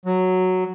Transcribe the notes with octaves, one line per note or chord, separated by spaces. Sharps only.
F#3